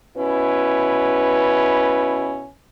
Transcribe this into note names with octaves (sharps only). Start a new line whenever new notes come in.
B2 C#4 E4 B4